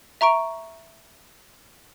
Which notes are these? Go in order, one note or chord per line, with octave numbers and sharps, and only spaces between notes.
E5 A#5 C#6 D7